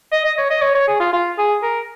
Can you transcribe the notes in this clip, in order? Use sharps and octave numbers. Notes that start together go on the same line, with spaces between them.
D#5
D#5
C#5
D#5
C#5
C#5
G#4
F4
F4
G#4
A#4